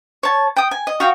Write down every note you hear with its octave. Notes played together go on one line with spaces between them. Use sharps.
C#5 A5
G5 D#6
G#5
D#5
F#4 F5 G5 D#6